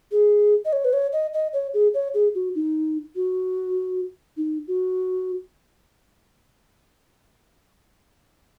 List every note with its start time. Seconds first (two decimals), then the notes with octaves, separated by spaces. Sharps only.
0.12 G#4
0.65 D#5
0.73 C#5
0.85 B4
0.93 C#5
1.13 D#5
1.33 D#5
1.53 C#5
1.74 G#4
1.94 C#5
2.14 G#4
2.35 F#4
2.55 D#4
3.16 F#4
4.37 D#4
4.68 F#4